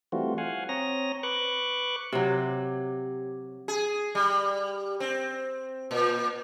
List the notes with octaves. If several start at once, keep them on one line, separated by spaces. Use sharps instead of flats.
E3 G3 A3 C4 F4 F#4
F5 F#5 G#5
C4 C#5 A#5 D#6 A#6
B4 C#6 D6 F#6
C3 F#3 G4 C#5
G#4
G3
C4
A#2